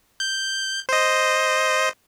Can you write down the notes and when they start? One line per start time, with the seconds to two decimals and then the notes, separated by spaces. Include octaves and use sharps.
0.20 G6
0.89 C5 D#5